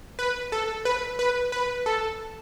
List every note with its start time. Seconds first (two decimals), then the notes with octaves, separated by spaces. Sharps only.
0.19 B4
0.52 A4
0.85 B4
1.19 B4
1.52 B4
1.86 A4